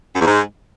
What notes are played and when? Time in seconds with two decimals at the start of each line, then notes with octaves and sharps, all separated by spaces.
0.15 F#2
0.21 E2
0.27 G#2